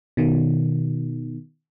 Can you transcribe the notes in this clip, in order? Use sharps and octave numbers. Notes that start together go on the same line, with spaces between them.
B2 D#3